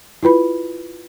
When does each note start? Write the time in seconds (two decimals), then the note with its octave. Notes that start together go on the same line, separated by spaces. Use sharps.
0.23 E4 F4 B4 B5